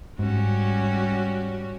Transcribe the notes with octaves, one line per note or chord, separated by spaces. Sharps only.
G#2 G3 C#4 F#4